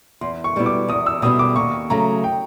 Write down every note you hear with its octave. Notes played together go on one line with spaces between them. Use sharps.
E2 C6
C#6
B2 G3 B3 E4
D6
E2 D#6
E6
B2 G3 B3 E4 D#6
D6
D#2 C#6
C#3 F#3 A3 A#5
G5